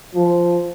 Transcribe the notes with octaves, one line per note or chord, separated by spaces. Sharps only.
F3